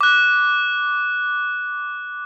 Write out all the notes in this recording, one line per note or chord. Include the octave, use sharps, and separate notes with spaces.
D6 F#6